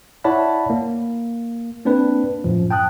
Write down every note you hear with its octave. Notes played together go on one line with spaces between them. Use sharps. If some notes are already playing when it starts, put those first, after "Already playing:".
E4 C#5 D5 F#5 A5 B5
A#3
A#3 C4 D4 B4
F#2 A2 F3
G5 A5 D#6 F#6